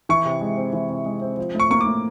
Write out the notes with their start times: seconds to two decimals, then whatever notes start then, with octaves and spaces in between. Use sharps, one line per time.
0.09 E3 C#6
0.26 C3
0.41 G#3
0.57 C4
0.73 E3
0.90 C3
1.06 G#3
1.22 C4
1.38 F3
1.55 A2 C#6
1.70 A#3 C#6
1.81 D6
1.86 A2